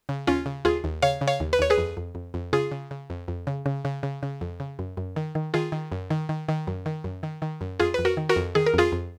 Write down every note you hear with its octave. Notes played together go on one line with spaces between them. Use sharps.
C#3
D#2 C#4 F4
C#3
D#2 F4 G#4
D#2
C#3 C#5 F5
C#3
C#5 F5
D#2
B4
D#2 C#5
G#4 B4
F2
F2
F2
F2
C#3 F4 G#4
C#3
C#3
F2
F2
C#3
C#3
C#3
C#3
C#3
F2
C#3
F#2
F#2
D#3
D#3
D#3 F4 G#4
D#3
F#2
D#3
D#3
D#3
F#2
D#3
F#2
D#3
D#3
F#2
F2 F4 G#4
F2 B4
F#4 A#4
D#3
F#4 A#4
F2
D#3 G#4
A#4
F2 F4 G#4
F2